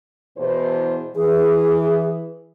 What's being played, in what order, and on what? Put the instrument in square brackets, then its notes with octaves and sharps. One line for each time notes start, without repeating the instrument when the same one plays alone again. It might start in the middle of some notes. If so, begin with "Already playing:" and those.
[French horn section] E2 B2 C5
[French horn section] E3 [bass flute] G#4